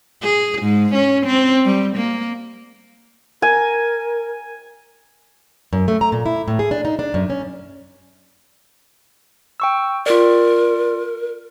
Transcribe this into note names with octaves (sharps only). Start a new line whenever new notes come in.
G#4
G#2
C#4
C4
G3
A#3
A#4 G#5
F#2
A3
A#5
A#2
E4
A2
G#4
D4
D#4
D4
F#2
C#4
G5 C#6 E6
F4 A#4 D5